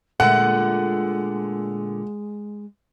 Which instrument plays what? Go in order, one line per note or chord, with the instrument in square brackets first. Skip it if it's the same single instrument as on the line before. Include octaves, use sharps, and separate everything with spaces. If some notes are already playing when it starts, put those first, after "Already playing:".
[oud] A#2 D3 A3 [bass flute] G#3 [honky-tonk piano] F#5